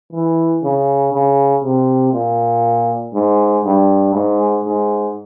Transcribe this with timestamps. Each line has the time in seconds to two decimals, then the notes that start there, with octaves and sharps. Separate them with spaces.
0.12 E3
0.63 C#3
1.12 C#3
1.63 C3
2.13 A#2
3.14 G#2
3.65 G2
4.14 G#2
4.65 G#2